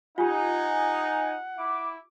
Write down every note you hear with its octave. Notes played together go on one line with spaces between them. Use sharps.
D#4 F4 G4 F#5 G#5
E4 D6